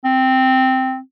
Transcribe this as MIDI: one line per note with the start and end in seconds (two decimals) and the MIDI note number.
0.05 0.99 60